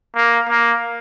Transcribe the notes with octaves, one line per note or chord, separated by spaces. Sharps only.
A#3
A#3